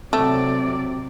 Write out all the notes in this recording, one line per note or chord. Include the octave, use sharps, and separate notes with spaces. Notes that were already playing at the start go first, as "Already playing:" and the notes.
C3 F#3 A3 C4 D5